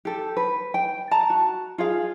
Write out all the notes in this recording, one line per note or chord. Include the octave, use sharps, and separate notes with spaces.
G4 A4
B4
G5
A5 A#5
F#4
F4 G#4 F5